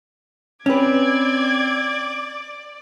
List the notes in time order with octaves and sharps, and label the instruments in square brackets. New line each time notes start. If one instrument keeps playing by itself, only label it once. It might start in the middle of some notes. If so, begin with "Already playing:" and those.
[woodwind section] C4 [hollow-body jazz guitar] C#4 B4 [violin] D5 D6 [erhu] G#6